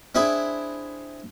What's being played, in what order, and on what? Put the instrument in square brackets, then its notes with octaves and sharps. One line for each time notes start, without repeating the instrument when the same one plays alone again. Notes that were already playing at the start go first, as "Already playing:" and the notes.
[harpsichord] C4 D4 E4 G#4